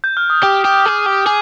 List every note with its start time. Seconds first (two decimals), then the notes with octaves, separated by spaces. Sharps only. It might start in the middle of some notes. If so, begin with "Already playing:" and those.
0.04 G6
0.17 F6
0.30 D#6
0.43 G4 D6
0.64 G4
0.85 G#4
1.06 G4
1.26 G#4